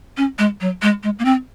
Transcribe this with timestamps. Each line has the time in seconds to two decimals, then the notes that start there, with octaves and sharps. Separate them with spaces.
0.17 C#4
0.39 G#3
0.61 F#3
0.82 G#3
1.03 G#3
1.19 A#3
1.25 C4